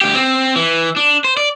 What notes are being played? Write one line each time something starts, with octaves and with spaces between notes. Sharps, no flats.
D2 G4
C4
E3
D4
C5
D5